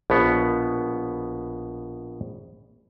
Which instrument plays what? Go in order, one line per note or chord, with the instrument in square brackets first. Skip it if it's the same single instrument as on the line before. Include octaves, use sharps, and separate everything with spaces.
[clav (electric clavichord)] A#1 B2 B3